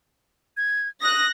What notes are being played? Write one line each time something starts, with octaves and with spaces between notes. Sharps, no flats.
G#6
D#6 F#6 A#6